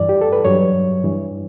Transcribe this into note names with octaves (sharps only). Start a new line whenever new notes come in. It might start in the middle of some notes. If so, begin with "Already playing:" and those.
Already playing: G2 E3 D5
G4
A4
B4
G2 F#3 C#5
G2 E3